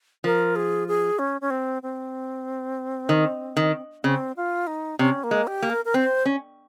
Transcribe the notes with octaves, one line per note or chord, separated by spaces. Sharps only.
F3 A#4
G#4
G#4
C#4
C#4
C4
C4
D#3
D#3
C#3 C4
F4
D#4
C3 C#4
A#3
G#3
G4
A#3
A#4
A#4
C4 C5
C#4